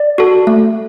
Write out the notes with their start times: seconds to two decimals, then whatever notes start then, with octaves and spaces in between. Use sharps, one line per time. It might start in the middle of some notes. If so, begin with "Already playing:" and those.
Already playing: D5
0.18 F#4 A4
0.47 A3